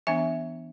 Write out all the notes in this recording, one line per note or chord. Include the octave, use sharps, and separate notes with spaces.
E3 B3 D4 E5 G#5